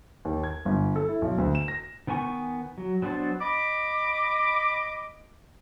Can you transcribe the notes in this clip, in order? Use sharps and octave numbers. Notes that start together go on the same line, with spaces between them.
D#2
G#6
G1
A4
E4
B1
D2
E7
A#6
D#3 B3 G#5 C#6
F#3
F#3 B3 D4 C5 A5
D#5 B5 D6